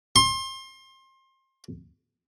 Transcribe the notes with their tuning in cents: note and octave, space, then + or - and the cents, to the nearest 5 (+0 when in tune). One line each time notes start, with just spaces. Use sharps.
C6 +30